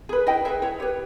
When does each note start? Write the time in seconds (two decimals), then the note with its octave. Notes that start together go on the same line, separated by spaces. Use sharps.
0.09 G#4 B4
0.27 E4 D#5 G5
0.45 G#4 C#5 E5
0.48 B4
0.62 E4 C#5
0.80 G4 B4 C#5